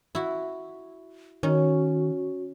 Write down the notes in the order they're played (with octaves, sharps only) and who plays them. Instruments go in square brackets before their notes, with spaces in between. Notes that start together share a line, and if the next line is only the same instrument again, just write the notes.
[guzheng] E4 F#4
[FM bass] D#3 [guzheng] C#4 [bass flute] F#4